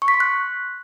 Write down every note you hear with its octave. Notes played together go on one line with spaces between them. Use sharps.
C#6
B6
C6
F#6